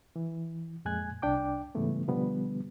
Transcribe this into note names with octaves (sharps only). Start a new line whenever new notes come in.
E3
F2 A#2 G#3 G#5 F#6 G#6
C2 D4 G5 D6
G#2 C#3 E3 G3 A3 B3
B2 D3 F3 G3 B3